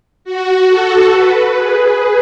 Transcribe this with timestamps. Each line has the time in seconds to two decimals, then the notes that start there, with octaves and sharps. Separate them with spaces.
0.25 F#4
0.68 A4
1.11 B4
1.53 G#4